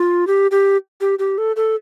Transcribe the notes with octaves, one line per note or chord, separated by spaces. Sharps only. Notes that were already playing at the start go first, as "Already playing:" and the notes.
Already playing: F4
G4
G4
G4
G4
A4
A4